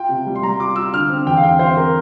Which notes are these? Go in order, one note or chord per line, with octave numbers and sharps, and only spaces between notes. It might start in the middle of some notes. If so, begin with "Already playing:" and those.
Already playing: F4 G5
C3
G3
C6
G3 A#5
F4 D6
F4 E6
D3 F6
C4
E2 G5
F5
C4 G5
C4 C5
C4 A#4